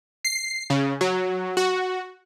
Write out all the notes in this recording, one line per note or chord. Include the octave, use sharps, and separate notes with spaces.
C7
C#3
F#3
F#4